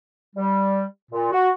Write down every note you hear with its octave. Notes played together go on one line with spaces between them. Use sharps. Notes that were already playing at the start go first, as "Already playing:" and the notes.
G3
A#2
F#4